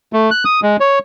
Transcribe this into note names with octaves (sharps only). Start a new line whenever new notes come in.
A3
F#6
D#6
G#3
C#5